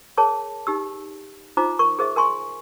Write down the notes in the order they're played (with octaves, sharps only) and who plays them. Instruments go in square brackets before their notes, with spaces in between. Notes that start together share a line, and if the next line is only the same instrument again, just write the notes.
[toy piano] G#4 A#4 C#5 A5
D#4 G4 E6
D#4 F4 C5 A#5 D6
A#4 C#6
G#4 A#4 C5 D#5 E5
A#4 G#5 C6 C#6